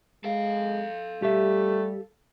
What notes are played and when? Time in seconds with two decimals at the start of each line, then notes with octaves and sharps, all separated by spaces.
0.24 G#3 A4 F5
1.22 G3 A3 G4 E5